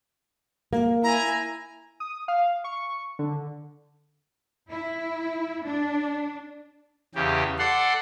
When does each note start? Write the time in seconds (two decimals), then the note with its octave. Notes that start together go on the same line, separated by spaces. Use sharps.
0.73 A#3
1.03 E4 G#5 A#5
2.00 D#6
2.28 F5
2.64 C#6
3.19 D3
4.70 E4
5.65 D4
7.15 E2 C#3 G4
7.59 A4 D5 F#5 C6